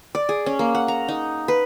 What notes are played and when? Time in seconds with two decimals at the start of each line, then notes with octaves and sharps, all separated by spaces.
0.15 D5
0.29 G#4
0.46 C#4
0.59 A#3
0.75 F#5
0.88 A#5
1.08 D#4
1.48 B4